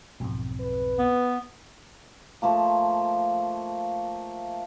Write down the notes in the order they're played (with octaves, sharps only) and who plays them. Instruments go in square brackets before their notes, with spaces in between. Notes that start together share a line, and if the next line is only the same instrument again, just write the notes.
[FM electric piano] B1 F2 [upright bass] G#2 C4
[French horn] B4
[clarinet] B3
[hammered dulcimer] F3 A3 A#3